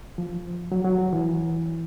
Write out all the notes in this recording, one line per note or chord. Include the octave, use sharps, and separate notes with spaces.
F3
F#3
F#3
F#3
E3